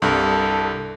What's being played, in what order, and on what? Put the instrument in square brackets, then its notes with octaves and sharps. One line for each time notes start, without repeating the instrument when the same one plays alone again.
[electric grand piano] C2 G2 [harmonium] A4